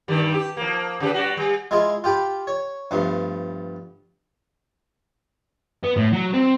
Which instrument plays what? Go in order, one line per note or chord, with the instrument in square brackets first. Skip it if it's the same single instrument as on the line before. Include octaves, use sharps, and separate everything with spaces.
[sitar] G2 D#3 G3
G4
F3 A#3
C#3 G4 B4
G3 F#4
G3
[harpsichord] G#3 E4 F4 G#4
F4 G4 G5 B5 D6
C#5
G2 F3 A3 B3
[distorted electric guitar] B3
A2
F#3
C4